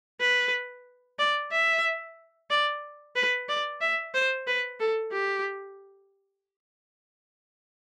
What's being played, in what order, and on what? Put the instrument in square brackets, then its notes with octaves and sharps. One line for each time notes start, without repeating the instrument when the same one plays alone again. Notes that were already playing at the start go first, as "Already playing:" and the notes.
[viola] B4
D5
E5
D5
B4
D5
E5
C5
B4
A4
G4